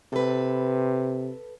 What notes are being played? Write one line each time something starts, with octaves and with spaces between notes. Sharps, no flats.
C3 A4 B4